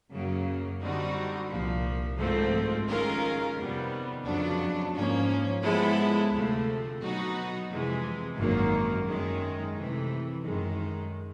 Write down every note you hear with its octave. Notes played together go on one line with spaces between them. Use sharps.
F#2 C#3 F#3 A#3
D3 G3 C4 D#4 F#4
C2 A#2 F3
G#1 G#2 F3 A3 C4
D#3 G#3 C#4 F4 A#4
F2 C3 D#3 G3 B3
F2 C#3 F#3 B3 D4
G#2 F3 A#3 C#4
F3 G#3 B3 E4 A4
D2 C3 F3 A3
B2 F#3 B3 D#4 F#4
F2 C3 E3 G#3
G#1 F#2 D#3 F#3 A#3
F#2 D#3 G#3
C3 E3 A3
F#2 D#3 G#3